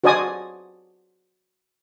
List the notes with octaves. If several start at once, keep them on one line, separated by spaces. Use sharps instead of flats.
F#4 C5 D5 D#5 G#5 D#6